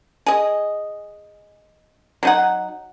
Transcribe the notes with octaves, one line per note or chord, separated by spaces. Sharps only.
G#4 D#5
F#3 D#4 F#5